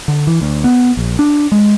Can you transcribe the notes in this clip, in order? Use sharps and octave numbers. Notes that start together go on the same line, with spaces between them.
D3
E3
D2
B3
A#1
D4
G#3